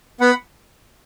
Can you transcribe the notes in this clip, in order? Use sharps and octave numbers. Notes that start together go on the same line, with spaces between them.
B3 F#5 B5